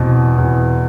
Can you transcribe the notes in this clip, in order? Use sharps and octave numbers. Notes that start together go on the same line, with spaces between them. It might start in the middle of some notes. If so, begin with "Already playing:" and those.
Already playing: E2 B2 C4
E2